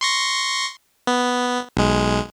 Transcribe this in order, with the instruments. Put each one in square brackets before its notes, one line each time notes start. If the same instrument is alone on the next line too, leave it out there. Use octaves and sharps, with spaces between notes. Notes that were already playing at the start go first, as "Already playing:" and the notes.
[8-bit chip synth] C6 C#6 A#6
B3
B1 G#3